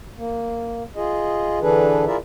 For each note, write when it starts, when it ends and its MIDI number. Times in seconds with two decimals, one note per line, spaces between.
0.16 0.83 58
0.96 1.59 65
0.96 1.59 68
0.96 1.59 75
1.62 2.05 50
1.62 2.05 52
1.62 2.05 62
1.62 2.05 68
1.62 2.05 69
1.62 2.05 71
2.07 2.17 64
2.07 2.17 65
2.07 2.17 68
2.07 2.17 70
2.07 2.17 74
2.07 2.17 76